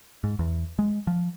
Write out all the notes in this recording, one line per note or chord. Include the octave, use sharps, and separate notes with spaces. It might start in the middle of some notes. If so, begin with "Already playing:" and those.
G#2
E2
G#3
F3